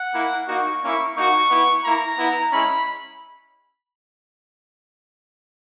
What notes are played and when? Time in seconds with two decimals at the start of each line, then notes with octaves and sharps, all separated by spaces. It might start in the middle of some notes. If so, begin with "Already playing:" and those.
Already playing: F#5
0.14 A#3 E4
0.48 A#3 D#4 F#4 C#6
0.82 A#3 C#4 E4
1.16 A#3 D#4 F#4 C#6
1.50 B3 E4
1.84 A#3 E4 A#5
2.18 B3 E4
2.52 G#3 C#4 E4 B5